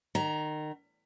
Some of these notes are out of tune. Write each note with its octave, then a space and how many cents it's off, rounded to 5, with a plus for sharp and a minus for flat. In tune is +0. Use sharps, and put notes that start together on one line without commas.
D#3 -30 A#5 +10